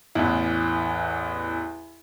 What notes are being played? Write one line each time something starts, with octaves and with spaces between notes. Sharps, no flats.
A1 E2